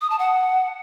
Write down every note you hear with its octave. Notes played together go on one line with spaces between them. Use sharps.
D#6
A5
F#5